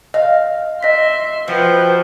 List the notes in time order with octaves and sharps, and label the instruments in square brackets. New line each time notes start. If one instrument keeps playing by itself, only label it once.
[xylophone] D#5 [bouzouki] F5
[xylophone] D#5 B6 [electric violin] E5 C6
[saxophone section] F3 [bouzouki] F#4 [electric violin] B4 G5